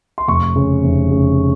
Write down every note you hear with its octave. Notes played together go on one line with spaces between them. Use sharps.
C6
F1 C#6
C#3
F1
C#3